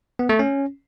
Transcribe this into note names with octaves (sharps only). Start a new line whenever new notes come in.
B3
A3
C#4